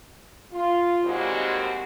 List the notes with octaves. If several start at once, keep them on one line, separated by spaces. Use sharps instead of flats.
F4
D#2 D#3 G3 G#3 C4 F#4